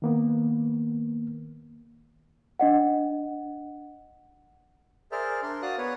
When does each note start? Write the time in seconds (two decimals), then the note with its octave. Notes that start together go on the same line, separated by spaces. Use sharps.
0.02 D#3 A#3 B3
2.59 D4 D#5 F#5
5.12 G#4 A#4 C5 D5 E5 F6
5.43 D4 A#4 C6
5.62 F#4 D5 F5 D#6 F#6
5.78 B3 B4 C#5